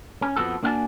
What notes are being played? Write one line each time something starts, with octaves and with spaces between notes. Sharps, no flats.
C#4
F2 F3 B3 F#4 A4
A#3 D4 F#4 F5 G#5 A5